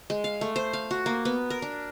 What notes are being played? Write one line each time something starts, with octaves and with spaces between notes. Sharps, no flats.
G#3
F5
A3
C5
F5
F#4
A#3
B3
A#4
D4